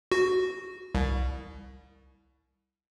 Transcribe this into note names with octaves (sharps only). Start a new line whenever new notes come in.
F#4
C2